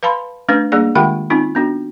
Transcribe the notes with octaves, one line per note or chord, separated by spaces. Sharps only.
B4 F5 A5 B5 C6
A3 C#4 D4 B4
G3 A#3 D4 G#4 D5
D#3 G#3 F4 G4 F#5 G5
C4 C#4 D#4 F4
B3 D4 F#4